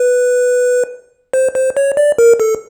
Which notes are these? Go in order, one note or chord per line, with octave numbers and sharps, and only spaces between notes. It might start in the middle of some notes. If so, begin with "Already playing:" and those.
Already playing: B4
C5
C5
C#5
D5
A#4
A4